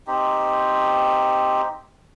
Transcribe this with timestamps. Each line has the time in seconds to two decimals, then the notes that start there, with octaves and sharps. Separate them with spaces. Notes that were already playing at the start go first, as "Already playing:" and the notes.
0.07 C4 D#4 G4